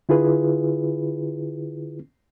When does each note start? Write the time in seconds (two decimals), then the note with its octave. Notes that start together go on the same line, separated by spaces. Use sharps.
0.09 D3 E4 F4 G#4 B4